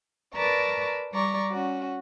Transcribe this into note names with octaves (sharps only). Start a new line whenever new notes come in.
A#4 B4 D5 A5 A#5 C#6
G3 D5 A#5 C#6
C#4 F#4